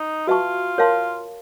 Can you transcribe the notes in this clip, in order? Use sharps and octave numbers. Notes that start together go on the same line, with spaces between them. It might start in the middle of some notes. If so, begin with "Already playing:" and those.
Already playing: D#4
F4 F#4 B4 E5 A5 C#6
A#4 C#5 F5 A5 C6